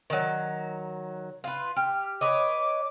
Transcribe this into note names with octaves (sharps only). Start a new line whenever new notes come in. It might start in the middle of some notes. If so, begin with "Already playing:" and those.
D#3 F#3
F4 B4
G4 F6
B4 C#5 D#5 D6